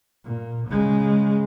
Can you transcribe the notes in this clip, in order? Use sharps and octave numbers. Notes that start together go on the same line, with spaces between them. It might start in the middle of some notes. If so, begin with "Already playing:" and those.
A#2
C#3 G#3